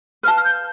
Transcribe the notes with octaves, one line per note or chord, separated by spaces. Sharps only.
B4 F5 A5 F6
F6
G6